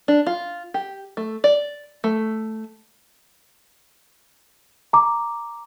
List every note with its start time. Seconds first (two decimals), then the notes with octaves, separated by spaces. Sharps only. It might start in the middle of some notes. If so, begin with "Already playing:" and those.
0.08 D4
0.26 F4
0.74 G4
1.17 A3
1.44 D5
2.04 A3
4.93 A#5 D6